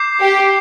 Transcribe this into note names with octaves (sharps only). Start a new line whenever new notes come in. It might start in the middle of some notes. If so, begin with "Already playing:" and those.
Already playing: D6 G6 C7
G4